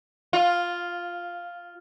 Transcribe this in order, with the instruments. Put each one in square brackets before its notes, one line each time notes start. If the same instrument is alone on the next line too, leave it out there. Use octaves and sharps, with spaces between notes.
[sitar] F4